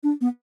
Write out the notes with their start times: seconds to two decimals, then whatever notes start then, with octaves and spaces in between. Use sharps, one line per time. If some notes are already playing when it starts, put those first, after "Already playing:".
0.03 D4
0.21 B3